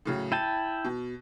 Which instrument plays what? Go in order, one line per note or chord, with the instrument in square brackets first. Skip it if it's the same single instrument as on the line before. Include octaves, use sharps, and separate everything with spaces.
[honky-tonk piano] A2 C#3 F#3
[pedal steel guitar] E4 G5 A5 [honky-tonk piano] D#7
[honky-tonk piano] B2